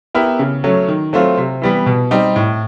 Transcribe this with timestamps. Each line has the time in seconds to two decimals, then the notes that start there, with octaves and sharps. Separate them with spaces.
0.15 B3 E4 G4 A#4
0.39 C#3
0.64 F#3 A3 C#4
0.88 D#3
1.13 F#3 A3 C4 F4
1.37 C3
1.62 E3 G3 B3
1.86 B2
2.11 G3 C4 D#4 G4
2.36 A2